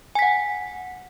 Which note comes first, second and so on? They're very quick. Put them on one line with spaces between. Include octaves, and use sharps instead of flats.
G#5 B6 F#5